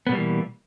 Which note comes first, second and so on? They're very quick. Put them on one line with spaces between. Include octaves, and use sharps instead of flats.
B3 B2 G3 A#3 E3